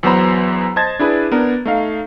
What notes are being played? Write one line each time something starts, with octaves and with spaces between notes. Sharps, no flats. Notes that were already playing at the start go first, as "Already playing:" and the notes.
E2 F#3 B3 C5 A#5 B5
C5 D#5 A5 G#6 A6
D4 E4 G#4 B4
B3 D4 A#4
A3 D#4 F5